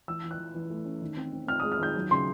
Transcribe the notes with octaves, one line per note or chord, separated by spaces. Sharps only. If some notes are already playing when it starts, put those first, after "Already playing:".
E3 E6
E3
F#6
E3
E3
A3
C#4
D#3
C4
C4
C4 F6
G#3 D#6
F6
D#3 G6
F#3
C#3 C6